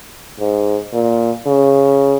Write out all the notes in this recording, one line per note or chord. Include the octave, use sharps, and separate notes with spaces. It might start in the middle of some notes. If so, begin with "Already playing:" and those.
G#2
A#2
C#3